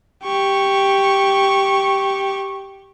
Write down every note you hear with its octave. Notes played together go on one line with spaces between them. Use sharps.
G4 C#6